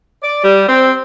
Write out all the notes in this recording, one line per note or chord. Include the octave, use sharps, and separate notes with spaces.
D5
G3
C4